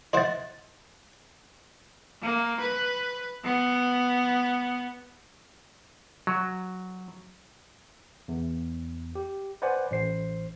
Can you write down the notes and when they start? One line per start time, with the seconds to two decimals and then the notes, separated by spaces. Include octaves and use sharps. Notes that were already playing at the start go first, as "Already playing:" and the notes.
0.13 E4 C5 D#5 F#5 A6
2.22 A#3
2.61 B4
3.44 B3
6.27 F#3
8.28 E2
9.15 G4
9.62 B4 C5 D5 F#5 G#5
9.91 A1 C5 C7